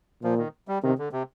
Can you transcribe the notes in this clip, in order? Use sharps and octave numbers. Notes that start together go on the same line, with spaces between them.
A#2 F3
D#3
G3
C3 D#3
D3
C3